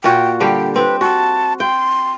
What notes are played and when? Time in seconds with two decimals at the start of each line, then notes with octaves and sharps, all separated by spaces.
0.04 A#2 F4 F#4 G5
0.40 D3 G3 G4 G5
0.76 C4 B4
1.01 F#4 A5
1.60 G5 C6